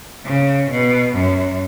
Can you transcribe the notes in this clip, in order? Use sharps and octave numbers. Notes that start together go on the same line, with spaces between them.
C#3
B2
F#2